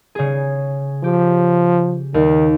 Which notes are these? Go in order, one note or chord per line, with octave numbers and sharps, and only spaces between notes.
C#3 G#4
F3 G4
D#2 D#3